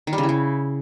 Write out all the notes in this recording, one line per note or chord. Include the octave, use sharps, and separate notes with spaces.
D#3
G3
C#3
E4
C#3